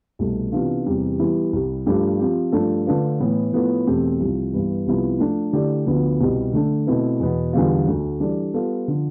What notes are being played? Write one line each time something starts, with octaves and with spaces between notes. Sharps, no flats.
C2 B2 A3
C3 E3 B3 D4 F4
E2 C3 E3 G3
E3 G3 B3 E4
C2 C3 G3
G2 F3 A3 D4 G4
F3 C4 G4
G2 F3 A3 D4 A4
D3 A3 D4 F4 B4
A2 E3 B3
A2 F3 B3 E4 A4
E2 B2 A3 C4 G4
C2 C3 F3 C4
G2 E3 B3
C2 C3 F3 B3 E4
F3 A3 D4 A4
D3 A3 E4 G4 D5
D2 D3 F3 B3
C2 B2 G3 C4
D3 A3 D4
B2 A3 C4 E4 B4
E2 B2 B3
E2 D3 G3 B3 F4
D2 D3 A3
E3 G3 D4 A4 D5
G3 B3 F4 A4
D3 F3